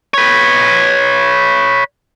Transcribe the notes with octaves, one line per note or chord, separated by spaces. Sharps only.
B4 C#5